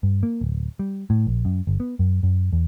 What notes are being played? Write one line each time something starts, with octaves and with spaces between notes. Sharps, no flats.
G2
A#3
D1
G3
A2
A#1
F#2
G1
B3
F#2
F#2
E2